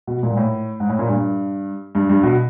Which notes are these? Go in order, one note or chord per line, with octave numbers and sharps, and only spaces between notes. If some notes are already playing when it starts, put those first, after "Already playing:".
B2
A#2
G#2
A2
G#2
A2
A#2
G2
G2
G2
B2